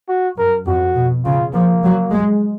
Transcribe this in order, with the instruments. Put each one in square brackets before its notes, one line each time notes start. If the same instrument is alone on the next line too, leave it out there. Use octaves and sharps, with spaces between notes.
[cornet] F#4
[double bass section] F#2 [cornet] A#4
[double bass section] F2 [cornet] F#4
[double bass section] B2
[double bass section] C#3 [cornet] F4
[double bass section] F3 [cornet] A#3
[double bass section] F#3
G#3